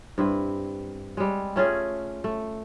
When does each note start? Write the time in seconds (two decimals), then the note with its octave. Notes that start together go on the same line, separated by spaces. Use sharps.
0.18 G2 C4 E4 B4
1.17 G3 G#3
1.56 A3 C#4 F4 G#4
2.24 A3